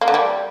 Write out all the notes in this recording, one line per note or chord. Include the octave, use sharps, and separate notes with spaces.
A#3
D3
G3